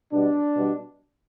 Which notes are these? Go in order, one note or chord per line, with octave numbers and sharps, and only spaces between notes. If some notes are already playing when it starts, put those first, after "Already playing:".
B2 G3 D4
B2 G3